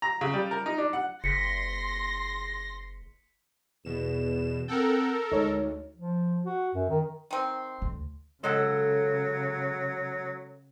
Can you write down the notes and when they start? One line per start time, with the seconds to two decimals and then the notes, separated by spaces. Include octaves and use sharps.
0.02 A#5
0.21 C#3
0.34 G3
0.51 A#4
0.66 D#4
0.78 D4
0.93 F#5
1.24 F#1 C6 A#6 B6 C#7
3.85 E2 B2 E7
4.68 C4 A4 A#4 F#5 G5
5.32 D2 G#3 D#4 C#5
5.97 F3
6.45 F#4
6.75 F#2
6.89 D#3
7.31 D#3 C4
7.82 D2
8.43 C#3 F#3 G#3 A4 F#5